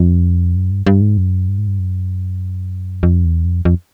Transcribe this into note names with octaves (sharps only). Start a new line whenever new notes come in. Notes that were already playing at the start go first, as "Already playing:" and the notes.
Already playing: F2
F#2
G2
G2
G#2
F#2
G2
G#2
G2
F#2
F2
E2
F2
F2